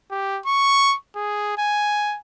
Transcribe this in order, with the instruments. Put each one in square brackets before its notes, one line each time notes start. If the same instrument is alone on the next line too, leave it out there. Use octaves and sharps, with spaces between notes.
[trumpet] G4
C#6
G#4
G#5